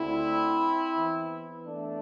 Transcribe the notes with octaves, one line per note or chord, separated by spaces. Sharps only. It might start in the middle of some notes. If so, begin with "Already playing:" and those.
Already playing: D2 D3 C4 E4
E2 E3
A3 D4